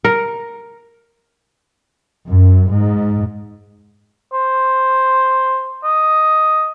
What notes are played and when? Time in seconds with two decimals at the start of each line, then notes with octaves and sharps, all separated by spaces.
0.05 A#4
2.28 F#2
2.71 G#2
4.33 C5
5.84 D#5